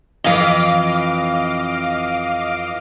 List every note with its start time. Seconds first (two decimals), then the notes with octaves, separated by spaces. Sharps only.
0.24 F2 E3 D#5 F5 D6